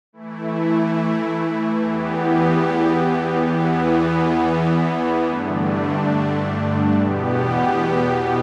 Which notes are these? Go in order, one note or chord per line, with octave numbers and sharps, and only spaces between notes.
E3 A3 E4
E2 E3 B3 G4
E2 E3 B3
G2 D3 A3 D4
E2 B2 B3 G4